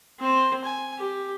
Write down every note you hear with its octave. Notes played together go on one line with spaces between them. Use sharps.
C4 C5
G#5
G4